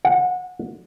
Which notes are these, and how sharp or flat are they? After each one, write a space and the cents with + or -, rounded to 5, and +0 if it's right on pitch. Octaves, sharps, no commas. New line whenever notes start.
F#5 -25